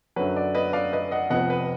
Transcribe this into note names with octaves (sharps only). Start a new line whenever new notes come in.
F#2 D3 F#3 B4
D5
B4 D#5
D5 F5
B4 D#5
D#5 F#5
F1 F2 F3 B3 D#5 F#5
B4